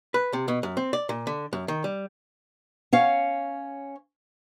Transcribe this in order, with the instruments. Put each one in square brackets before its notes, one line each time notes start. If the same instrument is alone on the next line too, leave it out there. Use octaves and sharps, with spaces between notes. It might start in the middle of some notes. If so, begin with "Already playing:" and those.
[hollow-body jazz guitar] B4
C3
B2
F#2
C4
D5
A#2
D3
F#2
D#3
G3
[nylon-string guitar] C#4 C#5 F5